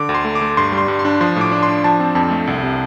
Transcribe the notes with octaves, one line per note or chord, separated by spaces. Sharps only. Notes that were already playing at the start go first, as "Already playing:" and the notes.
Already playing: D3 D6
D2
C6
A3
D6
A3
G2 C6
G3
C6
G2
C6
D4
F3 C6
A2 D6
D4
C6
D4
F3 A5
C4
F2 A5
A3
C2
C3